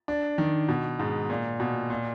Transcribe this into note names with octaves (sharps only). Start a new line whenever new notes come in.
D4
D#3
B2
G#2
A#2
B2
A#2